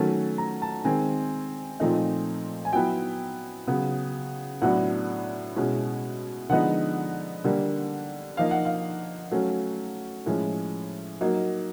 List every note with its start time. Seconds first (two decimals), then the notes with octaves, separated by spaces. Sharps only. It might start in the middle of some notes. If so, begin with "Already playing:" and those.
Already playing: D#3 F#3 A3 C#4 A5
0.38 A#5
0.62 A5
0.84 D#3 G#3 C4 G#5
1.80 A#2 F3 A3 C4 D#4
2.65 G#5
2.73 F#3 B3 E4 G5
3.67 C#3 F#3 B3
4.62 A2 F#3 B3 D4 F#5
5.56 B2 G#3 C#4 E4
6.49 D3 F3 G#3 B3 D#4 F#5
7.44 D3 G3 A#3
8.37 F3 A#3 D#4 F5
8.51 F#5
8.65 F5
9.31 F#3 A3 C#4
10.26 A2 F3 G#3 C#4
11.21 F#3 A#3 D#4